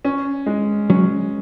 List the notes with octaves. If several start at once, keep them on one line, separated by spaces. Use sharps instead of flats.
C#4
G#3
F#3 C#4